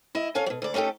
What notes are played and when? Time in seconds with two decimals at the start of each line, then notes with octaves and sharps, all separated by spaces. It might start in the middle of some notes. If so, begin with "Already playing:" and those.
0.15 E4 D#5
0.35 C#4 A4 F5 G#5
0.46 B2 F#3
0.62 D2 D5
0.74 A3 C#4 D#4 G4 A4